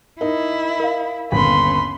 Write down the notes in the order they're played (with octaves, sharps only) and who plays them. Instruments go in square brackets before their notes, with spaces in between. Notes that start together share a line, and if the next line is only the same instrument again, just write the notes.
[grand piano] D#4 [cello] E4 [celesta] A#4
[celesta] A#4 F5
[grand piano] G1 D#2 [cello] C#4 [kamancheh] B5 C6